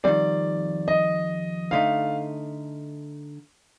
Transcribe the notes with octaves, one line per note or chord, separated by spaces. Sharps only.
F2 D#3 G3 C4 D5
D#5
D3 A3 D#4 F5